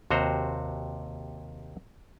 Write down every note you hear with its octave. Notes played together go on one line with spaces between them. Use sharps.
D#2 C3 F#4 C5 A#5